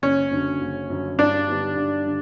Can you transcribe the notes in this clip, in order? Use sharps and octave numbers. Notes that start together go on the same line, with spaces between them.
F#1 C#4
F#2 D3
F#1
F#2 D3
G2 D4
D3 G3 B3 D#4
G2
D3